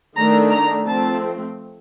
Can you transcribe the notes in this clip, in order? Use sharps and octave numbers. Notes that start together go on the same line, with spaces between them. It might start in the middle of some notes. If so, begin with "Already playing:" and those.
D#3 A3 D4 A#5
A#5
F3 A3 C4 A5